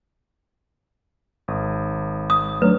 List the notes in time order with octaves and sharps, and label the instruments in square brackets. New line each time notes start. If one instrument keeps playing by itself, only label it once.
[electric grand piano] G#1 [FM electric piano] D#6
[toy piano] D#6
[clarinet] F#3 [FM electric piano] A3 D4 [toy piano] B4